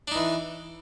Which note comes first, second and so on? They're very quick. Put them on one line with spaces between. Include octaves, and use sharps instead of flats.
D4 D#4 E3